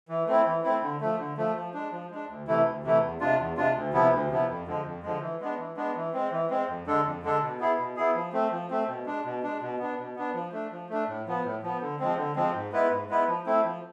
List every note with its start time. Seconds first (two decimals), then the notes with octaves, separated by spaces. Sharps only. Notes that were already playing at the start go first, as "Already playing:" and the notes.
0.09 E3
0.27 A3 C4 E4
0.46 E3
0.64 A3 C4 E4
0.82 D3
1.01 F3 A3
1.19 D3
1.37 F3 A3
1.55 F3
1.74 G#3 D4
1.92 F3
2.11 G#3 D4
2.28 D2
2.47 C3 E3 A3 E4
2.66 D2
2.84 C3 E3 A3 E4
3.02 E2
3.20 C3 G#3 D4 F4
3.39 E2
3.57 C3 G#3 D4 F4
3.75 D2
3.93 C3 F3 B3 E4
4.12 D2
4.30 C3 F3 B3 E4
4.49 F2
4.67 D3 F3 G#3
4.85 F2
5.03 D3 F3 G#3
5.21 E3
5.41 G#3 B3 D4
5.58 E3
5.76 G#3 B3 D4
5.95 E3
6.13 G#3 C4
6.31 E3
6.50 G#3 C4
6.68 F2
6.87 D3 G#3 D4 A4
7.05 F2
7.23 D3 G#3 D4 A4
7.42 B2
7.59 B3 E4 G#4
7.79 B2
7.96 B3 E4 G#4
8.15 F3
8.33 A3 C4
8.51 F3
8.70 A3 C4
8.88 B2
9.06 G#3 D4
9.25 B2
9.43 G#3 D4
9.61 B2
9.79 B3 D4
9.98 B2
10.16 B3 D4
10.34 F3
10.52 A3 D4
10.71 F3
10.89 A3 D4
11.08 A2
11.27 F3 B3
11.44 A2
11.62 F3 B3
11.81 D3
12.00 F3 G#3 C4
12.17 D3
12.36 F3 G#3 C4
12.54 G#2
12.72 G#3 B3 E4 B4
12.91 G#2
13.09 G#3 B3 E4 B4
13.27 F3
13.46 A3 C4 E4
13.64 F3